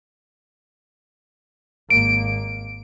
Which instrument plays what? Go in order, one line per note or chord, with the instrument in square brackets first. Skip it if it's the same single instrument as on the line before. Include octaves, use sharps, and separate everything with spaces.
[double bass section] G#1 A#3 [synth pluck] D7